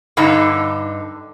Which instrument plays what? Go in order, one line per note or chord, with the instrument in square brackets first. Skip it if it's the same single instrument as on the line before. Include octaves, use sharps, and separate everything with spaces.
[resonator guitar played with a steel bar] G2 D3 D#4